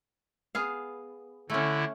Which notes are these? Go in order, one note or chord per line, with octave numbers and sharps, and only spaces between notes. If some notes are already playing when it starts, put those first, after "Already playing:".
B3 G#4 F5
D3 A3 C#4 E4